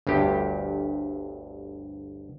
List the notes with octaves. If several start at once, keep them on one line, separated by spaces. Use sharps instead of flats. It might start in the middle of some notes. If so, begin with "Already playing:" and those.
G1 D2 G2 G4